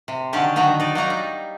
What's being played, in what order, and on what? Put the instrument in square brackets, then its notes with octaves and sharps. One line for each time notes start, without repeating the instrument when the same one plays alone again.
[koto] C3
D3 D#3 F#3 C#4 G4 A5
D3 D#3 F#3 B3 E5 A#5
D#4 D5
F#3 A#3 D#4 A#5
G3